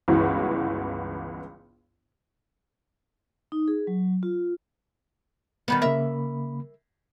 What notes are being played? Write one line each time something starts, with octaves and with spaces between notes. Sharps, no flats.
G1 C#2 E3 F#4
D#4
G#4
F#3
F4
D#3 G3 B3
C#3 A#3 A#4 E5 B5